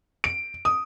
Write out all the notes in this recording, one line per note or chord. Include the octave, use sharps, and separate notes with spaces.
D7
D#6